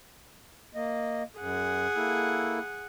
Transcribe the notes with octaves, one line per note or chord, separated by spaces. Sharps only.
A#3 D#5
F#2 G#4 F#5
A#3 E4 A4